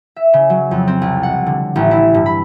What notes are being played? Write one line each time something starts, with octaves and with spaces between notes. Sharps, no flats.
E5
C#3
F#3
F2
C4
C2
F#5
D3
A1
E4
G2
B5